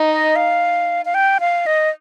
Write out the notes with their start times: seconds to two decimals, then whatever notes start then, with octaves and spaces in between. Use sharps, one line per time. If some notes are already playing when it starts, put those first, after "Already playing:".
Already playing: D#4
0.10 D#5
0.36 F5
1.05 F5
1.14 G5
1.40 F5
1.66 D#5